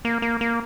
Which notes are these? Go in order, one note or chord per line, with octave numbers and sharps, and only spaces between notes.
A#3
A#3
A#3